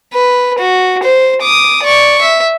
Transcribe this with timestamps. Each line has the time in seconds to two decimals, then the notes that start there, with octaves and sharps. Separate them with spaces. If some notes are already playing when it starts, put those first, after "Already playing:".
0.13 B4
0.58 F#4
1.03 C5
1.41 D6 D#6
1.83 D5 C#6
2.21 E5